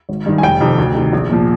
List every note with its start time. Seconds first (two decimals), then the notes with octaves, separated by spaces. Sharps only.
0.09 G#1
0.26 G2 D#3
0.38 G#5
0.43 F1 G5
0.61 F2 C3 D#3
0.78 D2
0.95 C3 D#3
1.13 A#1
1.29 A#2 F3